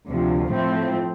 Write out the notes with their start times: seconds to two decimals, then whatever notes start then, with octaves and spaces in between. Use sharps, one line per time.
0.08 D2 C3 F3
0.51 A2 F3 A3 C4